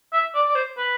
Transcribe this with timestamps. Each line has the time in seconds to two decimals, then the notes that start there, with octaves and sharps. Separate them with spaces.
0.13 E5
0.35 D5
0.49 D5
0.55 C5
0.77 B4